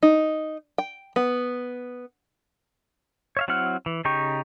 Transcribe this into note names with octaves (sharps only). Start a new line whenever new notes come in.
D#4
G5
B3
C#5 E5 F5
F#3 C4 E4 F#5 F6
E3
C#3 D#4 G4 G5 C#6